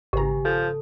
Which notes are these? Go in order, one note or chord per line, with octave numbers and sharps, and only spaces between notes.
G#1 C#3 G4 G#5 A#5
F3 A4